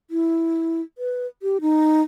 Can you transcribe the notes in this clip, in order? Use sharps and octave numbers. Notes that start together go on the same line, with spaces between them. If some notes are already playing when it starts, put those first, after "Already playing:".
E4
B4
G4
D#4